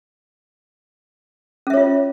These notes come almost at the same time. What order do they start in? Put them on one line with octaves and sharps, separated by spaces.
C#4 E5 C#5 F4